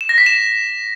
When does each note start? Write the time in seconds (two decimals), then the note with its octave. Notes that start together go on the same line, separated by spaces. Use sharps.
0.01 E7
0.09 A#6
0.18 B6
0.26 E7
0.35 B6